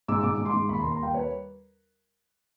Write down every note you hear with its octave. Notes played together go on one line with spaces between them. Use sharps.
G#2 D6 E6
G#2 D6 E6
G#2
C6 D6
G#2
D#2 B5 C#6
A#5 C6
D#2
A#5 C6
G3 F5 G5
G3 B4 C#5